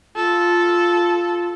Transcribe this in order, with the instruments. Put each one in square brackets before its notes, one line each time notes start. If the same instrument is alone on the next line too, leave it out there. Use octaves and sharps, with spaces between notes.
[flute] F4 [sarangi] A4